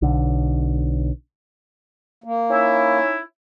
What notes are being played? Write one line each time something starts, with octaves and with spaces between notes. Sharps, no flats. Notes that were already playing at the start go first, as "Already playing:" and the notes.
B1 D3
A#3
C#4 D#4 E4